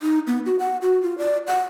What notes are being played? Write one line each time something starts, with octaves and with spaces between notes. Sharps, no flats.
D#4
B3
F#4
F#5
F#4
F4
D5
F#5